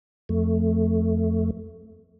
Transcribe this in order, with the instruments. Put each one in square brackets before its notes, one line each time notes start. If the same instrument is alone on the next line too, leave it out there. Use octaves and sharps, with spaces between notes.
[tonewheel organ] F2 A3